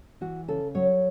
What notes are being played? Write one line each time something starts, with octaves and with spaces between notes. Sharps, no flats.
E3 F#4
C#3 A4
F#3 C#5